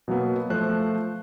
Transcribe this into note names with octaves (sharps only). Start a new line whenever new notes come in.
B2 F#3 A#3 B3
F3 A3 C5 F#6